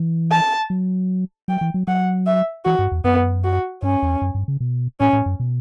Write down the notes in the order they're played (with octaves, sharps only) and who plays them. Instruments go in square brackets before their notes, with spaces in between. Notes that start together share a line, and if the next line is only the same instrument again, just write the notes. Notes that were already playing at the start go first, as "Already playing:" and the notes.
Already playing: [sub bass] E3
[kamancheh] A5
[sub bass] F#3
[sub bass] F#3 [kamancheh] G5
[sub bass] E3
F#3
[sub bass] F#3 [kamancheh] F#5
[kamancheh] E5
[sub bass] E3 [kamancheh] F#4
[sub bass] G2
E2
[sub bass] F#2 [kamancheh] B3
[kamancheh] F#4
[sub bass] G2 [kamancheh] C#4
[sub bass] E2
F#2
G2
C#3
B2
[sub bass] A2 [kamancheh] C#4
[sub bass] A2
F#2
B2